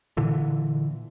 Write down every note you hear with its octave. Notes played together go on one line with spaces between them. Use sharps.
A#2 D3 E3